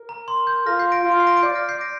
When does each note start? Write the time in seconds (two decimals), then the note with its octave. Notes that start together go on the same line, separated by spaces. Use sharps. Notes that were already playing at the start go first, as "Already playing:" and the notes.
Already playing: A#4
0.09 A#5
0.28 C6
0.47 G6
0.66 F4 F6 A#6
0.79 G6 C7
0.92 A#6 D7
1.04 F4
1.12 D7
1.20 C7
1.27 A#6 D7
1.37 D7
1.43 D5 G6 C7
1.55 F6 A#6
1.69 G6 C7
1.81 A#6 D7